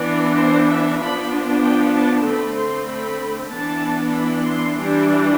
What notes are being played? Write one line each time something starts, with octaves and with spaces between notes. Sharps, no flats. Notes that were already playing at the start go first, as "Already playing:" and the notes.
Already playing: E3 B3 D4
C5
E5
F3 B3 D4 B5
G5
A5
D3 A3 C4 B5
C6
B5
E3 B3 D4 A5
B5
C6
E3 G3 D4